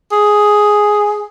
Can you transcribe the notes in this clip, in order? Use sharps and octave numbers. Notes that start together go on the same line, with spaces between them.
G#4